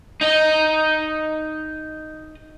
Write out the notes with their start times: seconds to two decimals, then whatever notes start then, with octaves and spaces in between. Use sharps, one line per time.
0.21 D#4 D#5